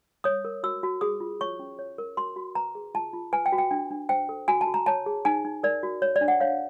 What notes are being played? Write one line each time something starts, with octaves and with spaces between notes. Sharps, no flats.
C#5 D#6
A#4
F#4 E6
F#4
G#4 D#6
F4
C#5 C#6
C#4
C#5
A#4
F#4 C6
F#4
B4 A#5
G#4
F4 A5
F4
B4 G#5
G5
F#4
G5
D4 G5
D4
C5 G5
A4
F#4 G#5
A5
F#4
A#5
C#5 A5
G#4
D#4 G#5
D#4
A#4 D5
F#4
C#5
D5
D4
F#5
C#5 F5